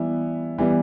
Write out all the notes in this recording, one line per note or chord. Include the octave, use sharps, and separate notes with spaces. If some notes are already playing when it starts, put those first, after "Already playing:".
Already playing: E3 G3 B3 E4
E3 G3 B3 E4